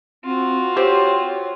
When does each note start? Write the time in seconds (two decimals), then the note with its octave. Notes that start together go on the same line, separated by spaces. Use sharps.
0.24 C4 F4 F#4
0.77 C4 G4 C#5